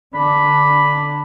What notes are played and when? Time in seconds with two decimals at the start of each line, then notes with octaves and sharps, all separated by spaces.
0.14 D3 D4 B5